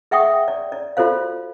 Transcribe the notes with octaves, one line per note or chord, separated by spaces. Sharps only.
G#4 E5 F#5 G5 C#6 D#6
D5
D5
F4 F#4 A4 C5 F5